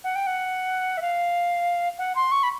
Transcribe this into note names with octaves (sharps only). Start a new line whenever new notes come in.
F#5
G5
F#5
E5
F5
F#5
C6
C#6
B5